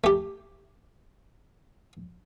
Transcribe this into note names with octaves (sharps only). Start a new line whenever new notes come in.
A3 G4